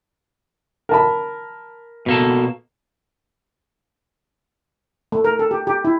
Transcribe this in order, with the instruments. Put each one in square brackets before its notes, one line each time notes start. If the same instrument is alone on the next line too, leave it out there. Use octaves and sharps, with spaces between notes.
[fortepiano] A#4 A5 B5
[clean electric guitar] B2 A#3 A4
[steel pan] A3
A#4
A4
G4
G4
E4